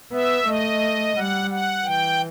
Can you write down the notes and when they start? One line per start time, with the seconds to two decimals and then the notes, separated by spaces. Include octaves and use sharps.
0.12 B3 E5
0.46 A3 D#5
1.16 G3 F#5
1.50 F#5
1.85 E3 G5